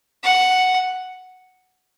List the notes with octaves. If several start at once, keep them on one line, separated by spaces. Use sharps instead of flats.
F#5